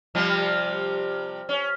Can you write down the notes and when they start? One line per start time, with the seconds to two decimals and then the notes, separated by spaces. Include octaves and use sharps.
0.15 C3 F3 G3
1.49 C#4